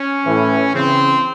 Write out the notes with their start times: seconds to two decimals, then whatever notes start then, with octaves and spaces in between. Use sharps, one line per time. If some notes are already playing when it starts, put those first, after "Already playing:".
Already playing: C#4
0.25 A2 E3
0.74 C#3 E3 C4